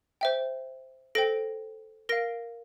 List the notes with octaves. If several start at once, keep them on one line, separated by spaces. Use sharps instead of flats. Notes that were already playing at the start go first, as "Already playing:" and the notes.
C5 E5 G5
A4 C5 G5 A#6 D7
A#4 F5 A#6 D7